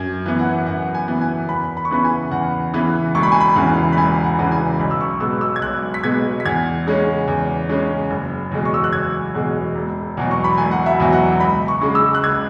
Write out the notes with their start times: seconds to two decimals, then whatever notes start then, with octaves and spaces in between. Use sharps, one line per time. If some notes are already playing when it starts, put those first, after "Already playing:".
Already playing: F#2 G#6
0.26 E3 B3
0.39 F#5
0.66 F#2 F#5
0.94 G#5
1.08 E3 B3
1.21 G#5
1.49 E2 B5
1.77 B5
1.85 C#6
1.91 C#3 E3 B3 B5
2.04 G#5
2.31 E2 F#5
2.74 C#3 E3 B3
3.15 E1 C#6
3.23 B5
3.32 G#5
3.40 B5
3.56 E2 C#3 E3
3.93 B5
3.96 E1 G#5
4.24 F#5
4.39 E2 C#3 E3
4.52 G#5
4.79 B1 B5
4.91 E6
5.01 C#6
5.20 B2 G#3 B3 E6
5.41 E6
5.56 G#6
5.62 B1 F#6
5.94 B6
6.04 B2 G#3 B3 G#6
6.40 B6
6.45 E2 G#6
6.87 C#3 G#3 C#4
7.28 E2
7.69 C#3 G#3 C#4
8.10 F#1
8.52 E2 B2 G#3
8.65 C#6
8.74 E6
8.84 F#6
8.93 F#1 G#6
9.34 E2 B2 G#3
9.75 E1
10.17 E2 B2 F#3
10.31 C#6
10.44 B5
10.58 E1 G#5
10.71 F#5
10.86 E5
11.00 E2 B2 F#3
11.13 F#5
11.40 C#2 B5
11.68 C#6
11.81 C#3 G#3
11.95 E6
12.15 F#6
12.23 C#2 G#6